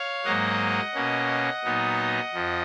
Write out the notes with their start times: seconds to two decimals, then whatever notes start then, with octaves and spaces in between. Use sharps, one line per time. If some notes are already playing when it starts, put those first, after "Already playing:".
Already playing: C#5 F5
0.24 G#2 F#3 A#3 D#5 F#5
0.94 B2 A#3 C#4
1.64 A#2 F#3 B3 D#4
2.33 F2 F3